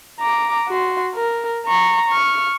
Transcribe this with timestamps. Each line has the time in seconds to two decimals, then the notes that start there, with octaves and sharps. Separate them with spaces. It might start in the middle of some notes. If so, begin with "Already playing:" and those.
0.20 A#5 D6
0.68 F#4 C6
1.14 A#4
1.65 A#5 C#6
2.08 C#6 F6